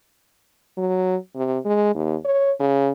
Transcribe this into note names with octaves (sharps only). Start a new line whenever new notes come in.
F#3
C3
G#3
D#2
C#5
C#3